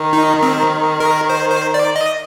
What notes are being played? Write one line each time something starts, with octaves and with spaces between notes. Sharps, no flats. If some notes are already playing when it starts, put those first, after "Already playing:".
Already playing: D#3
D#4
C4
A#4
C5
C5
D5
D#5